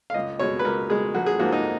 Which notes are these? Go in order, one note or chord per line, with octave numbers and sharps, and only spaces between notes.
F5
C#2 D#5
B2 G#3 C#5
B4
C#2 A#4
B2 G#3 G#4
A#1 F#4
G#4
G#2 F3 A#3 F#4
D#4